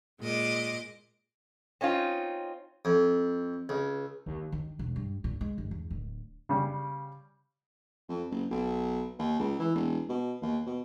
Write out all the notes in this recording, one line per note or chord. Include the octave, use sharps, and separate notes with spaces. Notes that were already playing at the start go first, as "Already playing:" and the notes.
A#2 G#3 D#5 D6
C4 C#4 D#4 F4
F2
C#2
D#2
D#3
E1
G2
A#2
G#3
G1
E2
D1
C#3 G3
F2
F#1
B1
D#2
C#2
E3
E1
B2
D#2
B2